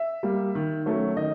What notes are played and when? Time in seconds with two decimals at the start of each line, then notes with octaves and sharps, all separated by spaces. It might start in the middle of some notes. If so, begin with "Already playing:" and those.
Already playing: E5
0.23 G3 A#3
0.55 D#3
0.86 F#3 A3 C#4
1.16 D#3 D#5